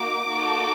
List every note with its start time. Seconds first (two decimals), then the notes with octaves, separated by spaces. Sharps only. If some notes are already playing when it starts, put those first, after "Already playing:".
Already playing: A#3 D#4 F#4 D6
0.29 A#3 D#4 F#4 A4